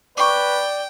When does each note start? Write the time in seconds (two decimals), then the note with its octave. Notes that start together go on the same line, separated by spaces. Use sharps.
0.18 B4 D5 G5 C#6 D6